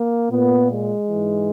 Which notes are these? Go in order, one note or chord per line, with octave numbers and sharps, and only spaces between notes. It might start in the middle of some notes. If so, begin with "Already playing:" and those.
Already playing: A#3
A#2 B3
G#3
G#2 E3